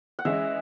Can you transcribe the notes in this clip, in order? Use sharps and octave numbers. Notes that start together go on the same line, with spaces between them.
F#5
E3 G#3 C#4 G#4 D#5 E5